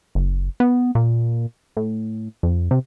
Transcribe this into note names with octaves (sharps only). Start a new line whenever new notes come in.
F#1
B3
A#2
A2
F2
C3